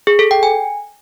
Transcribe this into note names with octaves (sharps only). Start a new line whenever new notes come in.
G#4
A4
G5
G#5